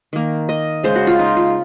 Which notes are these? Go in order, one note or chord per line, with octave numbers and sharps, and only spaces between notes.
D#3 A#3
D#5
C#3 G#3 C5
F#4
F4
D#4
F4